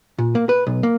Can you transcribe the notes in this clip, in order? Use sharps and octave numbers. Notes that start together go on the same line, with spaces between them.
A#2
A#3
B4
B1
A#3